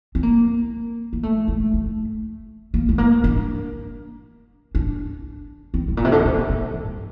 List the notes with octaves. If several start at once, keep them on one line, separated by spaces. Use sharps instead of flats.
C4
A#3
A#3
A3
A3
A3
A#3
A3
A#3
D4
D4
C4
A2
A#2
C3
D3
C3
A#2
A#2
G2